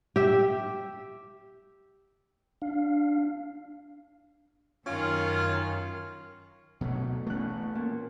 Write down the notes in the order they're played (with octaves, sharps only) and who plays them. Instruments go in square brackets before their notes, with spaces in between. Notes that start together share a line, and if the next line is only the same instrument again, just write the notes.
[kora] G4 E5
[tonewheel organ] D4 F5
[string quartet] F#2 D#3 [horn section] C#4 F4
[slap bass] B2 F#3 A3
[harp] E2 F#6 [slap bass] A3 C#4
[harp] A#2